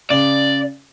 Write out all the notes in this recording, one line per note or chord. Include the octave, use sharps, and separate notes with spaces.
C#3 D5